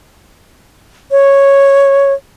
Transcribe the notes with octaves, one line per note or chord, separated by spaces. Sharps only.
C#5